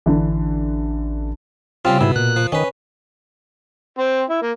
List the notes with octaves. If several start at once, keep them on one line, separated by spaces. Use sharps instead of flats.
A1 D3 E3
C#3 G3 C4 F4
G#2 B2 E4
A#2 F#6
F3
D#3 C#4 B4
C4
E4
A#3